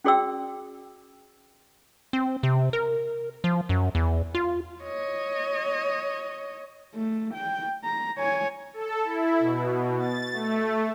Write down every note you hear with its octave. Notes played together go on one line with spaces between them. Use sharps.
C#4 F#4 G#4 D5 G5 E6
C4
C3
A#4
F3
F#2
E2
F4
C#5 D#5
A3
G5
A#5
C#5 G#5
A4
E4
B2
A6
A3